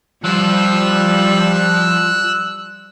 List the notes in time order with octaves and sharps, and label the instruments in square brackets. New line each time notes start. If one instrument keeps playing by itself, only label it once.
[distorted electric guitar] F3 C5 [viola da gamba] G3 [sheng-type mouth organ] E6 F#6